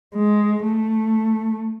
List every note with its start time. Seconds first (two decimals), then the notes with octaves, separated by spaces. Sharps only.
0.16 G#3
0.65 A3